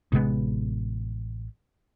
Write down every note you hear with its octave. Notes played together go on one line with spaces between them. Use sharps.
A1 C3 G#3 B3